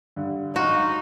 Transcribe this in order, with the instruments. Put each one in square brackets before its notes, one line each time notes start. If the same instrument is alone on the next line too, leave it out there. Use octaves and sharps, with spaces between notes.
[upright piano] G2 D3
[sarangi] D#4 [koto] F#4 [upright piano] F5 C6 F6